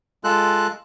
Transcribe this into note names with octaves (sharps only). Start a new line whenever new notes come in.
G#3 F4 A4 F#6